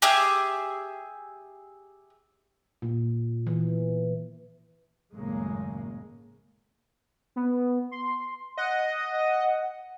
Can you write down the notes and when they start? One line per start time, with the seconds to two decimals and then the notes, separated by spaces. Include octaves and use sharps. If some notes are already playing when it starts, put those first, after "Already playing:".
0.02 G4 G#4 E5
2.82 A#2
3.47 E3
5.14 G#1 F#2 A2 C#3 G#3 A#3
7.36 B3
7.91 C6
8.57 D#5 F#5